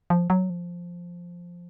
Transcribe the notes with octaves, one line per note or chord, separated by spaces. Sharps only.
F3
F#3
F3